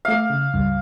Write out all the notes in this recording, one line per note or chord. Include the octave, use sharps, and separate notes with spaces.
A3 E5 F5
C#3
C#2 G2